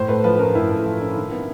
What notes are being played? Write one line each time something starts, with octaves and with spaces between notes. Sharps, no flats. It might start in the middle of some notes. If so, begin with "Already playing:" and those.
Already playing: A2 C5
A3 B4
F3 B4
C#4 A#4
A2 E4
A3
F3
C#4
D#3
B3